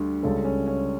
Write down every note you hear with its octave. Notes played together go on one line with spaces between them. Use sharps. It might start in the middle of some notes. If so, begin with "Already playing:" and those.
Already playing: D2 D3 G3
C#2 C#3 G3 A4
C#4
C#4